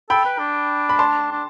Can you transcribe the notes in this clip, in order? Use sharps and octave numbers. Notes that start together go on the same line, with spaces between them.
A4 G5 B5
B4
D4
B5
A5 C6
D4